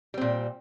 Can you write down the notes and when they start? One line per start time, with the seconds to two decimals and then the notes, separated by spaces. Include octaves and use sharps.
0.14 G3
0.18 C4
0.21 A#2